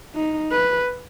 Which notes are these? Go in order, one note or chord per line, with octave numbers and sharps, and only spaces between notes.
D#4
B4